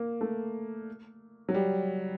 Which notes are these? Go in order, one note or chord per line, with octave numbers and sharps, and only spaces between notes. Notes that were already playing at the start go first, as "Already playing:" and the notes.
Already playing: A#3
A3
F#3
G3